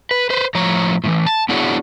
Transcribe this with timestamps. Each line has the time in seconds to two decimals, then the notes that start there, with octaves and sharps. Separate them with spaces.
0.11 B4
0.30 B4 C5
0.55 A2 F3 C#5 A#5
1.04 A2 D#3 E3
1.26 A5
1.49 B3 D4 E4 F#4 G#4 C#5